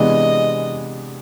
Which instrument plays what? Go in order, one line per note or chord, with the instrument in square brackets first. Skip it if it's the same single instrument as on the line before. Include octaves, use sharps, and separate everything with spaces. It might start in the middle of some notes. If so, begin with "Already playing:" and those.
Already playing: [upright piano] C3 E3 G#3 B3 D4 [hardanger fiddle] D#5